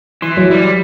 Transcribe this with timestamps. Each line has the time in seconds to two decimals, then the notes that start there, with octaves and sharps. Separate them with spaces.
0.22 E3 C6
0.37 F#3
0.51 G3